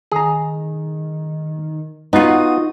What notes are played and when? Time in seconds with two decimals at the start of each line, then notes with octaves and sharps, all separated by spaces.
0.12 D#3 G#4 A#5
2.13 B3 D#4 F4 F#4 D#6